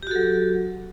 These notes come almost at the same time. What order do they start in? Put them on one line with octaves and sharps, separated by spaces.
G4 F#4 A4 F#3